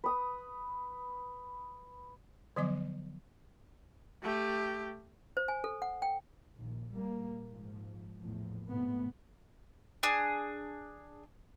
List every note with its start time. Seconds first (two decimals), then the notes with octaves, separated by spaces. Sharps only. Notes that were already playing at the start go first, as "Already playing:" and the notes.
0.04 B4 D#6
2.56 D3 F3 F#3 B3 D#5 D6
4.23 A3 G4
5.37 C5
5.48 G#5
5.64 A4
5.82 F#5
6.02 G5
6.56 A#1 D#2
6.93 A#2 G3 A#3
7.48 G#2 F3
8.20 A#1 E2 A2 F3
8.67 A#1 E2 G#2 C3 A3 B3
10.03 D4 G#4